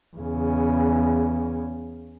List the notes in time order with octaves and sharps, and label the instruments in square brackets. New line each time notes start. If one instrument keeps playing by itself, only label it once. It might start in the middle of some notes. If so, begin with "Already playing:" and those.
[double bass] E2 C#3